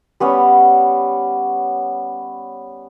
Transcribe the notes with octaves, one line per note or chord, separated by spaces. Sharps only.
G3 B3 C#4